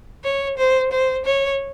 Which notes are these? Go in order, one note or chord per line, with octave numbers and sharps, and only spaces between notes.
C#5
C5
C5
C#5